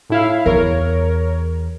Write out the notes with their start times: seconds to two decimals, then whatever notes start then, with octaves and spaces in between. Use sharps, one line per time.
0.10 A2 E4 F5
0.46 E2 A#4 C#5